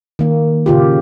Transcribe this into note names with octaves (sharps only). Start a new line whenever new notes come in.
D#3 A#3
A#2 C#3 F4 G4